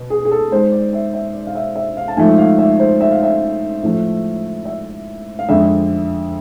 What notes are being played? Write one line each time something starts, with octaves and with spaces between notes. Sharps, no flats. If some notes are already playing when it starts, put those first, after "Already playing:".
Already playing: B2
G#4
G#4
A4
G#2 G#3 C5
D5
E5
E5
D5
F5
E5
E5
F5
A5
G#2 F3 A3 G#5
F5
E5
C5
E5
F5
E5
A2 F3 A3
E5
F5
F2 D3 G#3 E5